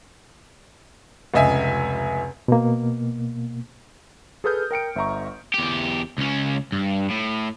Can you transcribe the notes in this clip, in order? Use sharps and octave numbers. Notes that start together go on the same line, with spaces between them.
F1 C#2 D#5 E5 G#5
B2 A#3
G#4 A4 B4 D#6 F6 G6
A#4 G5 C#7 D7
G1 E5 A#5 C#6
E2 G4
C#2 C#4
G2
A2